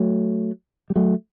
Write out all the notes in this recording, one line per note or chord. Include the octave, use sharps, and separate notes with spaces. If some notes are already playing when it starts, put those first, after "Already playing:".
Already playing: F#3 A3
G3
F#3 A3